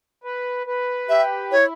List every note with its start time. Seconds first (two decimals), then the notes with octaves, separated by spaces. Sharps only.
0.24 B4
0.67 B4
1.09 G4 E5
1.51 E4 C#5